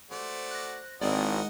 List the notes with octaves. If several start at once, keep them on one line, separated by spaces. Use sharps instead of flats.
A3 F#4 C5 D5
F#6 A#6
G#1 G#2 C4 E4 F#4 A#4 D5 D#5